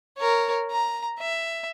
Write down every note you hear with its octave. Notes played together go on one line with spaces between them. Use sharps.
A#4 C#5
A#5
E5